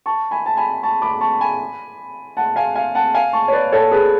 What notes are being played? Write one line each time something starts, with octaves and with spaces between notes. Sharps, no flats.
A5 C#6
G#5 B5
A5
G#5 B5
A5 C#6
B5 D6
A5 C#6
G#5 B5
F#5 A5
F5 G#5
F5 G#5
F#5 A5
F5 G#5
A5 C#6
C#5
B4 D5
A4 C#5
G#4 B4